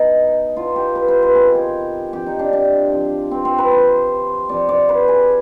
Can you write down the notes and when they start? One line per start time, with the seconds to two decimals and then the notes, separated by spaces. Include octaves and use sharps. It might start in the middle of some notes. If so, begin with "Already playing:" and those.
Already playing: B2 D#4
0.56 B2 F4
0.76 G4
0.95 B4
1.08 C5
1.22 B4
1.35 C3 D#3 G#4
1.55 G4
2.13 C3 F3 G4
2.26 D#4
2.39 D4
2.53 D4
2.92 C3 F3
3.31 C4
3.45 C4
3.58 B4
3.71 C3 F3 C5
4.49 C3 F3 D5
4.69 D5
4.89 B4
5.08 G#4